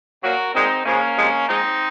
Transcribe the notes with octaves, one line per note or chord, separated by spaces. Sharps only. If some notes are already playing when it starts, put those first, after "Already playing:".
A#2 F#3 A#3 F#4 A#4
A#2 G#3 C4 D#4
C#3 F3 G#3 A#3 C#4
C3 F3 G#3
G#2 F3 G#3 C4 D#4